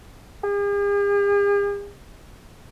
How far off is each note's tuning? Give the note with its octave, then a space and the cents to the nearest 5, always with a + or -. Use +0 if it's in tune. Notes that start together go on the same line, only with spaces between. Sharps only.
G#4 -45